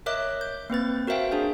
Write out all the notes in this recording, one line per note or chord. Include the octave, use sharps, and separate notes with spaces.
A#4 C#5 D#5 E5 D6 F#6
G6
A#3 C4 B4 A6
F#4 A#4 C5 E5 F5 G5
D4 G#4 G6